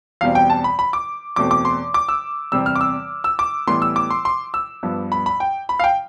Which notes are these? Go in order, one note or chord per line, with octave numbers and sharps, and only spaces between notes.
E2 B2 G3 C4 F5
G5
A5
B5
B5
D6
E2 B2 A3 C4 D6
D6
C6
D6
E6
E2 C3 G3 C4 E6
F6
D6
E6
E6
D6
A2 E3 G3 B3 C6
E6
D6
C6
C6
E6
G2 F3 B3
B5
B5
G5
B5
F5
G5